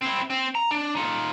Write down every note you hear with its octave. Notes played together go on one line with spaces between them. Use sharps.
C4 E4
C4
A#5
D4
D#4 F4